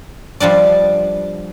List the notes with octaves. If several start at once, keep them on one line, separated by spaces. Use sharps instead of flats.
F3 G3 D4 D5